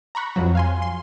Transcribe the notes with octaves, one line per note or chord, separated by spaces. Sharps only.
A#5 B5 C#6 F#6 A#6
F2 F3 F#3
F5 G#5 C6
C6